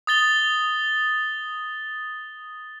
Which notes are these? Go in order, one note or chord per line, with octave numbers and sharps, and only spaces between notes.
D#6 A6 G7